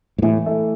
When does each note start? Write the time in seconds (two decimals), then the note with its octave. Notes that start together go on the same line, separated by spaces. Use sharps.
0.18 G#2
0.22 A2 E3
0.46 A3